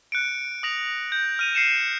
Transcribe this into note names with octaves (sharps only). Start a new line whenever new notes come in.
F#6 C#7 D7
D#6 A#6 F7
G6
F6 D#7 F7
F6 C7 C#7 E7